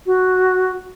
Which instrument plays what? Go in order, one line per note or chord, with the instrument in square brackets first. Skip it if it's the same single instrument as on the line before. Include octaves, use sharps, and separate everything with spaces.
[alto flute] F#4